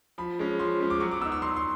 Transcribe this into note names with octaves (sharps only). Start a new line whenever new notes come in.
F3 B5
G#3 C#4
F3 C6
G#3 C#4
D6
F#3 C#6
D6
B3 D#4 E6
E6
F#3 C6
C6